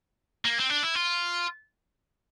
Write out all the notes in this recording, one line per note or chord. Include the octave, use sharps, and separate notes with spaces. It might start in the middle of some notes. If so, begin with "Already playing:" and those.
A#3
C4
D4
E4
F4